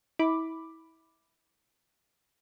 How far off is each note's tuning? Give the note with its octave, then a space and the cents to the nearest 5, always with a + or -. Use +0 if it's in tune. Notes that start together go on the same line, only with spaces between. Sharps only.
E4 -30 B5 +0 D6 +0